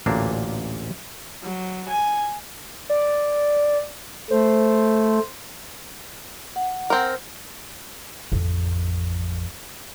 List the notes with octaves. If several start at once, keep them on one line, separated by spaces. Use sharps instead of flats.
A1 D2 A#2 A#3 D4
F#3
G#5
D5
A3 C5
F#5
C4 A#4
A1 F2